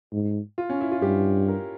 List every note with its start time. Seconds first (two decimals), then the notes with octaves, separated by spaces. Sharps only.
0.12 G#2
0.58 F4
0.70 C#4
0.81 E4
0.92 F4
1.02 G2 G4
1.48 A#4